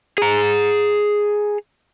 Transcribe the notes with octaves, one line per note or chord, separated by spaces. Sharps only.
G#4 A#5